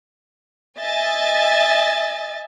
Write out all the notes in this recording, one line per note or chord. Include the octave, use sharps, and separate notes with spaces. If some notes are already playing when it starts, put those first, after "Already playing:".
D#5 E5 G#5 A6